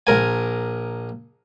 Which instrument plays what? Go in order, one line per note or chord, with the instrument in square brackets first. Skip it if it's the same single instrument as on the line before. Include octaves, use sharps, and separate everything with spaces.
[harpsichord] A#1 A#4 G#5